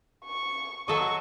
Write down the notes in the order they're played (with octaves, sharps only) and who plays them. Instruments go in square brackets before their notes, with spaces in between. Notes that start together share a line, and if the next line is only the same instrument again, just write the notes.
[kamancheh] C#6
[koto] F#3 A4 D#5 [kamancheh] C#6